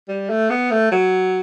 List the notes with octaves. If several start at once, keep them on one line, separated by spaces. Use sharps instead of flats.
G3
A3
B3
A3
F#3